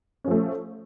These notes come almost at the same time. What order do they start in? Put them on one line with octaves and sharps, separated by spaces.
C#4 F3 A3